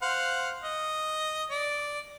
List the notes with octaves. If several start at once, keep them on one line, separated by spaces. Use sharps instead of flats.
C5 F5 F#5
D#5
D5